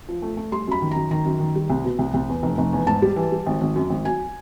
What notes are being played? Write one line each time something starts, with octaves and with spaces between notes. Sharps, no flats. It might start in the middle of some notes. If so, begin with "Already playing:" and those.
F3
A3
A3
G3 C6
F#2 B5
D#3
F#2 A#5
D#3 A#5
F#2
D#3
G3
C2
B2
C2
C2
E2
F1
F1
E2
G#2 A5
G3
E3
G3
G#1
G#1
F#2
G#1
F#3 G#5